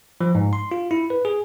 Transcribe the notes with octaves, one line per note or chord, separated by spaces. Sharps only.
F3
G#2
C6
F4
E4
B4
G#4